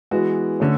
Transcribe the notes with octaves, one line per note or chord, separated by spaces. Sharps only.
E3 G#3 B3 F#4
D3 A3 C#4